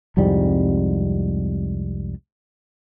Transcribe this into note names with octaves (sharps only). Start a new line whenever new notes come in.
C2 F2 G#2 G3